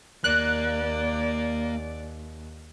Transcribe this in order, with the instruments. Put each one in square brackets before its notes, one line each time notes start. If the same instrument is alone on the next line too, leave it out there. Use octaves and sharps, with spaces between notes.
[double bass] D#2 [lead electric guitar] A#3 [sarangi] D5 [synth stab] F#6